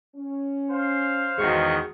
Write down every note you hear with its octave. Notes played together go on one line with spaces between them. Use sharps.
C#4
C5 F5
E2 D#3 G#3 F#4 C#6